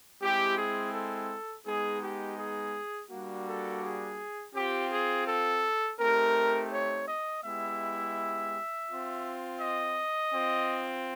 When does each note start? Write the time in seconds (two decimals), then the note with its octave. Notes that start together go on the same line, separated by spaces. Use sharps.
0.21 G#3 C4 E4 G4
0.57 G#4
0.93 A4
1.66 G#3 B3 D#4 G#4
2.02 G4
2.39 G#4
3.11 G3 A#3 D4 F#4
3.47 A4
3.82 G#4
4.55 C4 F4 G4
4.91 G#4
5.28 A4
5.99 A3 C4 D#4 G4 A#4
6.72 C#5
7.08 D#5
7.44 G#3 B3 E4 G4 E5
8.88 C4 F4
9.60 D#5
10.33 C4 F4